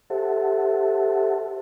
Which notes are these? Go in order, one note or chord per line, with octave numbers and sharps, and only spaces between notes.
G4 A4 C5 E5 F#5 A5